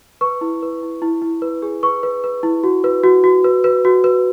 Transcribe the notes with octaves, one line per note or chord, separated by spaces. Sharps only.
B4 C#6
E4
B4
E4
E4
E4
B4
G#4
B4 C#6
B4
B4
E4
F#4
B4
F#4
F#4
B4
B4
F#4
B4